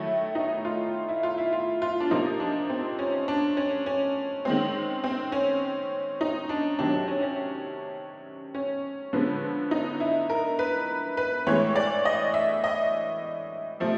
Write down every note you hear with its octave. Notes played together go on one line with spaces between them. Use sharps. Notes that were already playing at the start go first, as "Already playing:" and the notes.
Already playing: D#3 F#3 A3 E4
D#4
F4
E4
F4
E4
F4
F4
D4
C3 F3 A#3 D#4
D4
C4
C#4
D4
C#4
C#4
D#3 G#3 C4
C4
C#4
D#4
D4
C3 D#3 F#3 D4
D4
C#4
C#4
C#4
D3 F3 G#3 B3
D#4
E4
A#4
B4
B4
A2 E3 G#3 C#5
D5
D#5
E5
D#5
C3 F3 A3